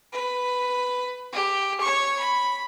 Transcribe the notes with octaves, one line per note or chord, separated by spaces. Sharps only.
B4
G4
C#5 C#6
B5